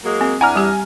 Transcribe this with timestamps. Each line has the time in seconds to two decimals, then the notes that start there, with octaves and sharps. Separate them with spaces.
0.04 F#3 G#3 A#3
0.21 C4
0.41 E2 D4 E4 F#5 G#5 A#5 F6
0.56 G3 G4